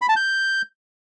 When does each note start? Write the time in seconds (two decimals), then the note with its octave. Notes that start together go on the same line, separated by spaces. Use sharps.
0.02 B5
0.09 A5
0.16 G6